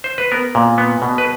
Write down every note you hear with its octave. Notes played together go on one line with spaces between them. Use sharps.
C5
B4
B3 A#4
A#2
B3
B2
B4